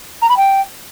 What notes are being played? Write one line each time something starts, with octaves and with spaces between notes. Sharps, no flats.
A#5
B5
G5